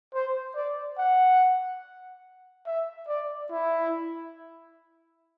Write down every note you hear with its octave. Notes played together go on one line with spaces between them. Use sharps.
C5
D5
F#5
E5
D5
E4